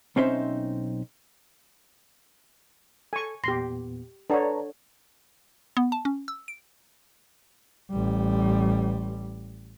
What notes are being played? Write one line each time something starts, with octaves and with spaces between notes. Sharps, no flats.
B1 C4 C#4 D#4 C5 E5
A4 G#5 C#6
E2 A#2 B3 G4 C6 A#6
D4 A4 B4 C#5 D5 F#5 A5 A#5
B3
A5
C#4
E6
D7
A1 G3